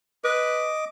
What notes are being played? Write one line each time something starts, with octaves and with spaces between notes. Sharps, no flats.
B4 D#5 D6